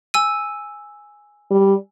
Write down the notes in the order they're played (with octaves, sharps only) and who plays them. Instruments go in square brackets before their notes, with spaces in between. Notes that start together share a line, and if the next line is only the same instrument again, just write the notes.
[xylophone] G#5 E6 D#7
[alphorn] G3